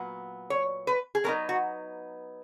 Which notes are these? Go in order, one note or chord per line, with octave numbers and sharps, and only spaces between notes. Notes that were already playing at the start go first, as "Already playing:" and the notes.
Already playing: A#2 F#3 B3
C#5
B4
G#4
F#3 B3 D#4 A#4
F#4